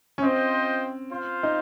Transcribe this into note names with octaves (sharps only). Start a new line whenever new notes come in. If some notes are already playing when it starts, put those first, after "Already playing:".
C#4
C4 F4 C5 D#5 G5
F4 C5 F5
D#4